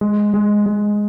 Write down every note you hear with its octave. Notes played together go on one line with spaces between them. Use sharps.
G#3
G#3
G#3